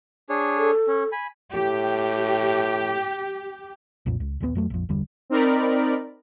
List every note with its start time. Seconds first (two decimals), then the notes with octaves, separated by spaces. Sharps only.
0.30 D4 G#4 C#5
0.57 A4
0.88 C#4
1.12 G#5 B5
1.54 A2 G4
4.06 B1 F2 A#2
4.20 C#2
4.40 A#1 D#2 D3 B3
4.55 F2 F#3 A3
4.70 A#1 F2
4.89 G1 E2 D3 G3
5.30 C4 D#4 A#4 D5 B5